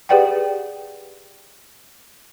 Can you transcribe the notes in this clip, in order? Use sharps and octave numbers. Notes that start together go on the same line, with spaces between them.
G4 G#4 B4 D5 F#5 G5